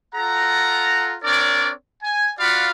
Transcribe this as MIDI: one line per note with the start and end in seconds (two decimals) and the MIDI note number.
0.15 1.16 65
0.15 1.16 69
0.15 1.16 78
0.15 1.16 82
1.24 1.72 60
1.24 1.72 62
1.24 1.72 70
1.24 1.72 73
1.24 1.72 74
2.03 2.31 80
2.39 2.70 65
2.39 2.70 66
2.39 2.70 74
2.39 2.70 77
2.39 2.70 78
2.39 2.70 83